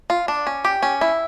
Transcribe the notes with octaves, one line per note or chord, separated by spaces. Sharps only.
F4
D4
C#4
G4
C#4
E4